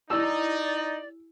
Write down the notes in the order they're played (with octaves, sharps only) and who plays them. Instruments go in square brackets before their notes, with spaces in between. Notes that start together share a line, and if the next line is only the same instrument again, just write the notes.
[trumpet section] D#4 [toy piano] E4 G4 G#5 [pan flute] D5 [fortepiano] E6